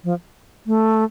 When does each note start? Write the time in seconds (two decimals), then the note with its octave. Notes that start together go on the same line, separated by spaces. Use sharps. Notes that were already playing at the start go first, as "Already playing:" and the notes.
0.04 F3
0.67 A3